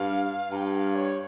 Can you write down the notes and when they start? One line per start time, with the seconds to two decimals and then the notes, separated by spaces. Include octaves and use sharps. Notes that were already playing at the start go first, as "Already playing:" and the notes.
Already playing: G2 F5
0.51 G2 A#5
0.56 G5
0.73 G5
0.77 F5
0.95 C#5